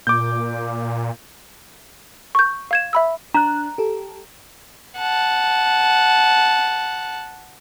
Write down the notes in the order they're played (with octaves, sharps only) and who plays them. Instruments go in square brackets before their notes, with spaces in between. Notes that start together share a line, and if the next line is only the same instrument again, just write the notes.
[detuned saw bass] A#2 [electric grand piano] D6 G6
[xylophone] C#6 G6
F5 G#6 E7
E5 B5 E6
[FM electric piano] D4 F#6 [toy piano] A#5
[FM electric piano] G4 A4
[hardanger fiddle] F#5 A5